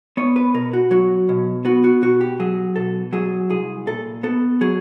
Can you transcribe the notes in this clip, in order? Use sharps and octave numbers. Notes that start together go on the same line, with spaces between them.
B3 C#5
B4
B2 A#4
F#4
F#3 F#4
B2
B3 F#4
F#4
B2 F#4
G4
F#3 G#4
B2 A4
F#3 G#4
C2 G#4
A#2 A4
B3 A4
F#3 G#4